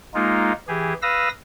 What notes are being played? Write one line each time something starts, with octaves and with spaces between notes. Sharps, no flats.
G#3 A#3 D#4 F4
E3 G4 G#4
B4 F5 D#6 E6 A#6